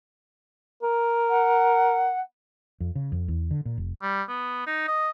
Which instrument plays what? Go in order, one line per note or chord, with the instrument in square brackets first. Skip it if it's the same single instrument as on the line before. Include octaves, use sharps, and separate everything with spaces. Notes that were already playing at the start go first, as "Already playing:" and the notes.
[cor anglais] A#4
[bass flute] F#5
[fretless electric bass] F2
C#3
F2
E2
D3
A#2
F1
[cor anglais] G3
B3
D#4
D#5